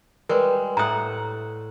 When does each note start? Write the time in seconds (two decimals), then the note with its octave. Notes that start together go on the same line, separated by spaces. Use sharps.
0.29 G3 G#3 A#4 B4
0.77 A2 F#5 A#5 D#6